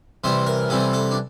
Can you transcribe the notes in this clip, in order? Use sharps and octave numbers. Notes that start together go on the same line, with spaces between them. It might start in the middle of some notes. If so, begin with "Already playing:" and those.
C3 E3 G3 C4 C5
A#4
C3 E3 G3 C4 A4
A4
D4